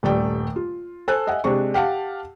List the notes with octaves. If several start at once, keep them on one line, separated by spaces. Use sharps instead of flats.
D#1 G2 A3 D5 G5
F4
A4 C5 G#5 A5 F#6
D#5 E5 F#5 G#5
C3 G#3 D4 C5 C#6
G4 F5 F#5 A5